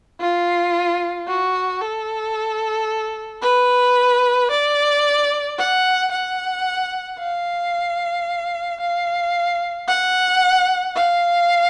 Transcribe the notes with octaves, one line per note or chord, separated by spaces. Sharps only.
F4
F#4
A4
B4
D5
F#5
F#5
F5
F5
F#5
F5